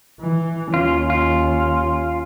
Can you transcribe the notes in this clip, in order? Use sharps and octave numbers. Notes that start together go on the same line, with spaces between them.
E3
D#2 C#4 F4
F4